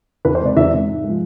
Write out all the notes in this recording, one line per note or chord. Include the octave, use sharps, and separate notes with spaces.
E2 B4
C5
C3 G#3 D5
E2 E5
C3 G#3
G#2
F3 G#3